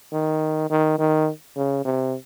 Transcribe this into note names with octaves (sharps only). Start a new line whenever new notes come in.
D#3
D#3
D#3
C#3
C3